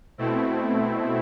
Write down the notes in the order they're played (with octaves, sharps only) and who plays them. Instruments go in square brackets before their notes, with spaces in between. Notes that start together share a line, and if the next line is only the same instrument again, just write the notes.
[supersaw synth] B2 A3 C4 E4